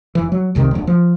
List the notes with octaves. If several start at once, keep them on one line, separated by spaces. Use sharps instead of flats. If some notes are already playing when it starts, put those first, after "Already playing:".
F1 E3
F#3
E1 C2 C3 D#3
D#1 D2
F3